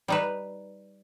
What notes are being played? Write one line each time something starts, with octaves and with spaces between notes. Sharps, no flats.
G3 D#4 B4